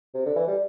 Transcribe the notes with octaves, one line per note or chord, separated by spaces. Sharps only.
C3
D3
E3
G3